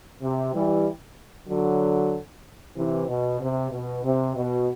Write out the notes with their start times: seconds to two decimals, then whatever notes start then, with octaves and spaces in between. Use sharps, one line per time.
0.22 C3
0.53 E3 G3
1.49 D3 F#3
2.76 C3 E3
3.08 B2
3.40 C3
3.71 B2
4.04 C3
4.35 B2